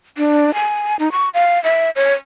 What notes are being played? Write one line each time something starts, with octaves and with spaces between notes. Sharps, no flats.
D4
G#5
D#4
C#6
F5
E5
C#5